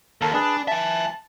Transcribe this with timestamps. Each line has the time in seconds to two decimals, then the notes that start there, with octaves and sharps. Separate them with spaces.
0.21 D#2 A4 A#4
0.34 D4 G#4 B4 A5
0.68 E5 G#5 A5